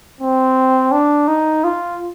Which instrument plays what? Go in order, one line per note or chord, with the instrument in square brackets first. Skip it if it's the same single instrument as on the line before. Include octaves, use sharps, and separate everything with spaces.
[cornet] C4
D4
D#4
F4